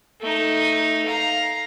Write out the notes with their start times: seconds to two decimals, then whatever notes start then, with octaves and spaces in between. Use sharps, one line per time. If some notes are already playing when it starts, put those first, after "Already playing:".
0.21 A3 D#4
1.06 F5 A#5